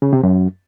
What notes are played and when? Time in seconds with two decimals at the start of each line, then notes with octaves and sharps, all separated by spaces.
0.02 C#3
0.13 C3
0.23 F#2